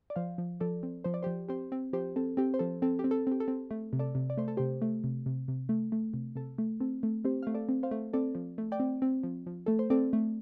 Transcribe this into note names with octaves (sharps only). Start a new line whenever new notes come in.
D5
F3 C5 F5
F3
F3 A4 D5
C4
F3 C5
D5
F3 G4 C5
C4 G4 C5
C4
F3 G4 C5
C4 A4
C4 G4
C5
F3 A4
C4 A4
G4
C4
A4
C4 G4
A4
C4
A3
C3
A4 D5
C3
D5
A3 C5
A4
C3 G4 C5
A3
C3
C3
C3
A3
A3
C3
C3 A4
A3
C4 A4
A3
C4 G4 C5
A3 F5
A4 D5
C4
C5 F5
A3
C4 A4 D5
F3
A3
D5 G5
C4
C4
F3
F3
A3 A4
C5
C4 A4 D5
A3